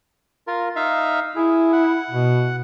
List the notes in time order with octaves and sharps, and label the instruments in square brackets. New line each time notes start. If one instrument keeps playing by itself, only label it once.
[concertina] F4 A#4
D#4 E5 F5
[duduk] E4 [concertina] G#4
[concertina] F#5
[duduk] B2